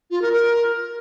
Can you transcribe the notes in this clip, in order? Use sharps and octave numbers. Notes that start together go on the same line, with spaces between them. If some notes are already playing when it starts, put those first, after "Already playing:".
F4
A#4
A#4